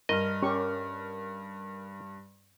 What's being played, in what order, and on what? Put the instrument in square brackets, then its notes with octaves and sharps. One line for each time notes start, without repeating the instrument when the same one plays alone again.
[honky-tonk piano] G2 [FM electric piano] A#4 F6 [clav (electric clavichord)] D#5
[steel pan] C#4 G4 C#6